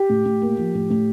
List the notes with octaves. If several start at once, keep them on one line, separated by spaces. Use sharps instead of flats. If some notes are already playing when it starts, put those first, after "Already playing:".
Already playing: G4
A2
A2
A#3
F3
A2
A2